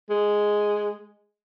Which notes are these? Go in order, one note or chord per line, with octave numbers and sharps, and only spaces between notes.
G#3